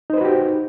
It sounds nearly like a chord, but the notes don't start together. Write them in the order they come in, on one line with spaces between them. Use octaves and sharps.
D#4 C5 B4 F#4 G4